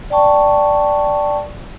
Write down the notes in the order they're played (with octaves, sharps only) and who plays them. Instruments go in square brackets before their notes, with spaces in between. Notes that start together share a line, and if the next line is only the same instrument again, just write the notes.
[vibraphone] D5 G5 A5 C#6